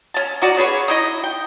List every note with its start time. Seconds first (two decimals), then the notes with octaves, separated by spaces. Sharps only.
0.14 C#4 A5
0.42 D#4 F#4 D5
0.57 C#4 G#4 B4 C#5
0.88 D#4 E4 D#5
1.24 G5